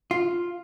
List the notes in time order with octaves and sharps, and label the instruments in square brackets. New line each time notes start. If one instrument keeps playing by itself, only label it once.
[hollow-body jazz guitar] F4